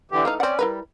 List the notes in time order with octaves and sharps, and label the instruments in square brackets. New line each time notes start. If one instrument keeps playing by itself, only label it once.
[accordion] D3 E3 G4
[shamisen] E3 A3 D#4 [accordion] F5
[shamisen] C4 F#5 [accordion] C#4 D5
[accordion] G3 [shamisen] E4 A#4 B4